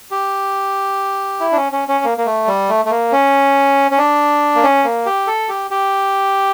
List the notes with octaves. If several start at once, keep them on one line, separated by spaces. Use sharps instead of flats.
G4
E4
D4
C#4
C#4
C#4
A#3
A#3
A3
G3
A3
A3
A#3
C#4
C#4
D4
A#3
C#4
A#3
G4
A4
G4
G4